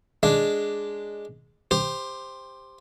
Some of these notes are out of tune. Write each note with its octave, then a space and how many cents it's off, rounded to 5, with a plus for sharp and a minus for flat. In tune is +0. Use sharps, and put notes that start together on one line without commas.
G#3 +0 D4 +0
G4 +20 C5 +0